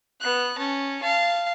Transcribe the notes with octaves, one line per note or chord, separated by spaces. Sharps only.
B3 F#6
C#4 A5
F5 A5